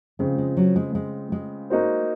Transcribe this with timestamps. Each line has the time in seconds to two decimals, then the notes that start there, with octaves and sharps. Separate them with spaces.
0.19 C#3 F3 G#3 C4 F4
0.38 G#3
0.57 F#3
0.76 G#3
0.95 G#3
1.32 G#3
1.70 A#3 D#4 F#4 C5